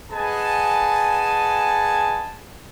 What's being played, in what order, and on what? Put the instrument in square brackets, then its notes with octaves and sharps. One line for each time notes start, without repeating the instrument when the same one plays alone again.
[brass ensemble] G#4 B4 D#5 F#5 G#5 A5